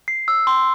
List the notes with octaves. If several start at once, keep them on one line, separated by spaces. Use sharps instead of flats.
C7
E6
C6